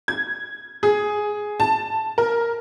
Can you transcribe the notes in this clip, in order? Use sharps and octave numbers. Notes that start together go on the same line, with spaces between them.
G#6
G#4
A5
A#4